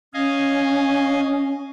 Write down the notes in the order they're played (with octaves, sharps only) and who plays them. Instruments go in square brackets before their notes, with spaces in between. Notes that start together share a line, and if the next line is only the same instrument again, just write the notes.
[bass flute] C#4 [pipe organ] D#5 F5 G#5